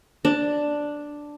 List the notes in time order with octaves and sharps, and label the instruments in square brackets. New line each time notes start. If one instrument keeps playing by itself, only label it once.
[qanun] D4